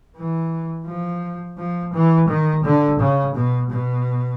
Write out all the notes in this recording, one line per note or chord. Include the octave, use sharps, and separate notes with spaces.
E3
F3
F3
E3
D#3
D3
C#3
B2
B2